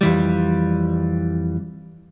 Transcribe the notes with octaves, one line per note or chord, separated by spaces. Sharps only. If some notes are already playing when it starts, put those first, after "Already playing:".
F2 E3 G3